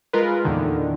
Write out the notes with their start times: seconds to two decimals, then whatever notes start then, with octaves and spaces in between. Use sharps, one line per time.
0.13 G#3 F4 A#4 B4
0.44 E2 A#2 D3 D#3